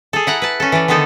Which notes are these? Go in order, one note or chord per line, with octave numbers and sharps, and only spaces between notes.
G#4 A4
E4 F#5 A#5
B4 A5
C#4 A4
E3 D5
D3 D#3 B3 D#4 A4